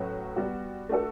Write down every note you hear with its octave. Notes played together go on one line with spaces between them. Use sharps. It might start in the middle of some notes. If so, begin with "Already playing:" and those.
Already playing: A2 F#3 C#4 F#4 B4
G3 B3 F#4
A3 D4 F#4 A4